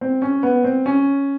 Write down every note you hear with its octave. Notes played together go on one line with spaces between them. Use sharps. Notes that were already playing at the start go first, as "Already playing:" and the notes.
C4
C#4
B3
C4
C#4